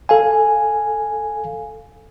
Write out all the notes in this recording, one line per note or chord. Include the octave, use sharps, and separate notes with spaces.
A4 F5 G#5